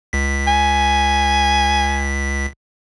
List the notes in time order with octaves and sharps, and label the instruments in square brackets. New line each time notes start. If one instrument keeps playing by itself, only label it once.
[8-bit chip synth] C#2 B6
[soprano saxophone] G#5